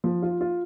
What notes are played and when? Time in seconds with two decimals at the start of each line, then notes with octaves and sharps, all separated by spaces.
0.04 F3
0.22 F4
0.41 F4